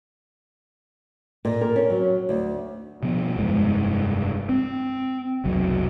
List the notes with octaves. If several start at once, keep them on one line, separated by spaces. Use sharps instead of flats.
A#2
A#4
C#4
F#3
D2
B2 F3 B3
F1 G2 G#3
C4
F1 B1 F#3